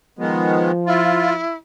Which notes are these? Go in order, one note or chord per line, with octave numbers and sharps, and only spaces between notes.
D#3 F3 G#3 B3
E4 F4